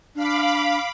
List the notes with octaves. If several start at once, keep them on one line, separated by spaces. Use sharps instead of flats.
D4 F5 B5 D6